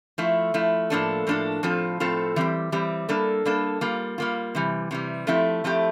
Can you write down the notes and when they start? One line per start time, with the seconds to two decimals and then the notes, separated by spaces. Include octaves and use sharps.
0.18 F3 A3 E4
0.54 F3 A3 E4
0.90 A2 F3 A#3 D4 A4
1.27 A2 F3 A#3 D4 A4
1.63 A2 F3 C4 F4 A4
2.00 A2 F3 C4 F4 A4
2.36 E3 G3 C4 G4
2.72 E3 G3 C4 G4
3.09 G3 A#3 D4 A4
3.45 G3 A#3 D4 A4
3.81 G3 A#3 F4
4.18 G3 A#3 F4
4.55 C3 E3 G3
4.91 C3 E3 G3
5.27 F3 A3 C4 E4 G4
5.64 F3 A3 C4 E4 G4